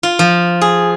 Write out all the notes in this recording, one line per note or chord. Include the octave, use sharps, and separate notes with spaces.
F4
F3
G#4